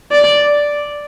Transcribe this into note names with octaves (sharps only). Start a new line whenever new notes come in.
D5